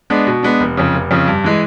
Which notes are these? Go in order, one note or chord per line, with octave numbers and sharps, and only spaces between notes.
G#3 B3 D4
B2
G#3 B3 D4
F1
F2 C#3
F1
F2 C#3
G2
E3 G#3